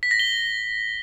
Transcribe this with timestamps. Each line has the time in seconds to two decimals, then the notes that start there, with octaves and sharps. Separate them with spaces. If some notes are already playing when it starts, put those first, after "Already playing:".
0.03 B6
0.11 A#6
0.19 G7